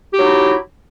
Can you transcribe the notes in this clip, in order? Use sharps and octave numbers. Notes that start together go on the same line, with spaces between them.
F#3 D#4 E4 G4